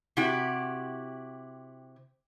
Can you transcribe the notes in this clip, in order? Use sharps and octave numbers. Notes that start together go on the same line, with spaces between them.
C3 E4 F#4 G4